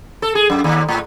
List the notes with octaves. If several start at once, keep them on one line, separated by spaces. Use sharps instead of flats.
A4
G#4
F#2
D#2
A2